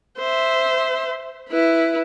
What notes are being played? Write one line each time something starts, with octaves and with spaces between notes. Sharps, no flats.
C5 E5
E4 B4